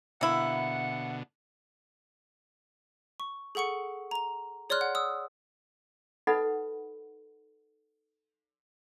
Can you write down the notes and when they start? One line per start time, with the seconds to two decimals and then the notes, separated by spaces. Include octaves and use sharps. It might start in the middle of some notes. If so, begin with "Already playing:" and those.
0.21 B2 D3 A#3 E4 F#5
3.20 C#6
3.55 G#4 A4 F#5 C#6 C#7
4.11 A#5 F7
4.70 G#4 C#5 D5 C6 F6 F#6
4.81 F#5
4.95 D#6 E6
6.27 D#4 A4 B4 D#5 F#5 B5